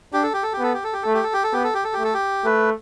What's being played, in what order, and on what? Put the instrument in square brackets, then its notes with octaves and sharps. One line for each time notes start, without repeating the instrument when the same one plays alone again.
[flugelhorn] D4 [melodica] G4
[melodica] A4
G4
A4
G4
[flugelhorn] B3 [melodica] A4
[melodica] G4
A4
G4
[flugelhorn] A3 [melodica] A4
[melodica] G4
A4
G4
A4
[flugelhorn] B3 [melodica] G4
[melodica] A4
G4
A4
G4
[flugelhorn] A3
[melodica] A4
G4
[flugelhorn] A3 [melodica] B4